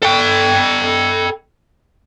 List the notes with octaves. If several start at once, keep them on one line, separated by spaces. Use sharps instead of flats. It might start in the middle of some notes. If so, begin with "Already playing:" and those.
A4 G5